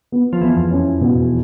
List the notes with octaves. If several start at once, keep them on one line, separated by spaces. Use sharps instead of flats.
B3
F3
E2 E3 B3
F2 F3
C#4
B2